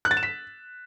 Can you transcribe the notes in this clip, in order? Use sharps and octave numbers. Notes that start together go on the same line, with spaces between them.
F#6
A6
E7
B6